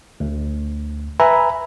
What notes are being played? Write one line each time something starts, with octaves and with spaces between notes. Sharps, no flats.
D2
B4 E5 G#5 A#5 B5